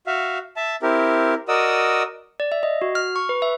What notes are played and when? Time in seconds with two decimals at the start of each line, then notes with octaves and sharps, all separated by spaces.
0.07 F#4 E5 F5
0.56 E5 A5
0.82 C4 E4 G4 A#4
1.48 F#4 A#4 D5 D#5 D#6 E6
2.40 D5
2.52 E5
2.63 D#5
2.82 F#4
2.95 F6
3.16 C#6
3.29 B4
3.42 E5